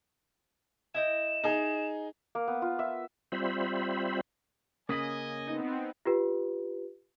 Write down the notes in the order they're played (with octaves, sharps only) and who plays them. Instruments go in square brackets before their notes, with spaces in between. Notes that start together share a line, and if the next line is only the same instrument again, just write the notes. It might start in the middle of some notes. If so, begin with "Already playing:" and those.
[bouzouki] E4 D#5 G5 [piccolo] E7
[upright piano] D#4 G#4
[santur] A#3
B3
F4
E5
[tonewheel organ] G3 C4 F4 C5 E5 B5
[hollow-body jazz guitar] C#3 A#3 C#4 [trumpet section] D#5 G#5 [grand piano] D#6 B6 F#7
[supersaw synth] B3 C4 [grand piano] D#4
[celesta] F4 G4 B4